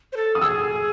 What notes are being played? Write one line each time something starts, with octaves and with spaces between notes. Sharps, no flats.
C5
A4
D#6
G#4 E6